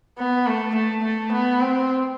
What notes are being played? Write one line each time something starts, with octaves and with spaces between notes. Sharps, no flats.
B3
A3
A3
A3
B3
C4